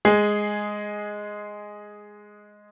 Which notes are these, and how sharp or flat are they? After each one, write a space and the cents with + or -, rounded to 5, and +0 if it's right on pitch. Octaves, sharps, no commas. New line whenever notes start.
G#3 +0 G#4 +0